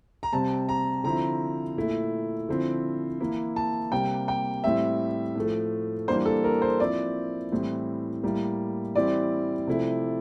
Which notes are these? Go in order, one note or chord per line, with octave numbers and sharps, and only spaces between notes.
A#5
C3 G3 C4 A5
A#5
D3 F3 C4 E4 A#5
A#2 A3 E4
D3 F3 C4 E4
E3 A#3 E4
A5
C3 G3 A#3 G5
G5
A2 G3 C4 E5
A2 F3 A3
E3 G3 A#3 D4 C5
A4
A#4
C5
F3 C4 E4 D5
A2 E3 G3 C4 E4
A2 G3 A#3 E4
E3 G3 C4 E4 D5
C3 F3 A3 E4